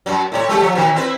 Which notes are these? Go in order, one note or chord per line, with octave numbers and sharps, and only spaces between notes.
F#2 F#3
A2 E4 C#5
G#3 A3 G4
F3
B2 D#3 E3
C4 E4 B4